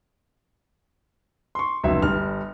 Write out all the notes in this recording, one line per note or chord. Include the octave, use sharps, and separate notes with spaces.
C6 C#6
F1 C#2 F#3 E5
G1 G3 F6